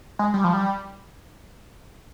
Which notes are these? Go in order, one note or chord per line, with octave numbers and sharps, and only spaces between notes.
G#3
G3
F3
G3